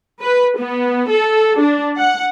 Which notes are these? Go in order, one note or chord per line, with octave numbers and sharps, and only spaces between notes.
B4
B3
A4
D4
F#5